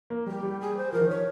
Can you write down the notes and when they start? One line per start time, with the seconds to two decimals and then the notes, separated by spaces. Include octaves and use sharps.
0.10 A#3
0.26 G3 G4
0.43 G3
0.60 G#4
0.76 C5
0.92 F3 A#4
1.00 D#3
1.08 F3 C#5